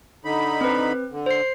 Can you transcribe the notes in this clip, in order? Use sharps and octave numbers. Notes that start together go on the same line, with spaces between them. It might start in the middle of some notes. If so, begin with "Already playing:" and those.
D3 D#4 B5
C4 B4
D3
C5 C7